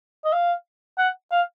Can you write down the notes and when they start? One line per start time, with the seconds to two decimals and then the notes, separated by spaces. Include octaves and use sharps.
0.25 D#5
0.33 F5
0.98 F#5
1.32 F5